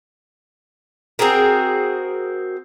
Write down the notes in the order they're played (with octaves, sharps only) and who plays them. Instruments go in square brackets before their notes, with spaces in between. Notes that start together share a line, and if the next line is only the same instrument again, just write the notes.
[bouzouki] C4 F#4 G#4 A#4